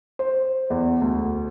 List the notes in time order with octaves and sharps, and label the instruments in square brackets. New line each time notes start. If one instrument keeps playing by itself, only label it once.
[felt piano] C5
E2
D2